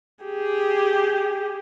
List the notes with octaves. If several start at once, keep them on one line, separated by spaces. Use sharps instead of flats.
G4 G#4